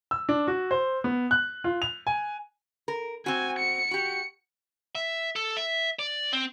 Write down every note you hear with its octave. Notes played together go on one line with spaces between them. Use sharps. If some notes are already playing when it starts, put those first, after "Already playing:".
E6
D4
F#4
C5
B3
F#6
F4
F7
G#5
A#4
C4 F#4 G#5
C#7
F#4 G4
E5
A4
E5
D5
C4